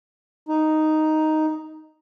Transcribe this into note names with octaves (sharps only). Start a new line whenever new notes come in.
D#4